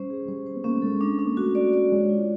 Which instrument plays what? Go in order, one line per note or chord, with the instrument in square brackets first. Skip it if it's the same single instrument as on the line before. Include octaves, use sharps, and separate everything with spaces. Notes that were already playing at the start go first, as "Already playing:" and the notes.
Already playing: [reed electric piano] G3 [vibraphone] C#4 C5
[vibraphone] G#4
[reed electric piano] G3 [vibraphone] C5
[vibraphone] C5
[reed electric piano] B3
[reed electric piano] A#3 [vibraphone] C#4
[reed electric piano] A3
[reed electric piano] G#3 [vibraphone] A4
[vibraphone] D4
D4
[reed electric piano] A#3
[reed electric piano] A3 [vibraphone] F#4
[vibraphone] D5
D5
[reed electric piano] G#3 [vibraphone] C#5
[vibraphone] F4